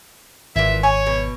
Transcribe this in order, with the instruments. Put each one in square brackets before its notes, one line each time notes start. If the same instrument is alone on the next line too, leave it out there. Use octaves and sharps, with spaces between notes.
[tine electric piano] G#1 [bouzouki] A#2 E3 [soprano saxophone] E5
[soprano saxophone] C#5 [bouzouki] G#5
[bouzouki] B2